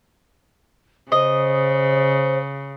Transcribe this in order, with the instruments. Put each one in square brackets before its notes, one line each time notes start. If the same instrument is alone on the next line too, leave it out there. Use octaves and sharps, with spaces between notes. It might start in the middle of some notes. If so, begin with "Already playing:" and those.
[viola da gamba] C#3 [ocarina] C5 [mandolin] D#5